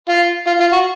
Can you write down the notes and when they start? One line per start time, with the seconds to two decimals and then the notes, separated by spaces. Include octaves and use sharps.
0.09 F4
0.47 F4
0.60 F4
0.72 F#4